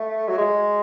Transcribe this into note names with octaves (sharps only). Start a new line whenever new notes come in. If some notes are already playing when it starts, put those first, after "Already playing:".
Already playing: A3
F#3
G#3